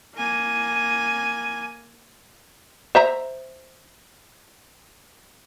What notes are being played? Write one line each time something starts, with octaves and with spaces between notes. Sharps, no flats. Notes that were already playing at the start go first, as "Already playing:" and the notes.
A#3 G#5
C5 E5 A#5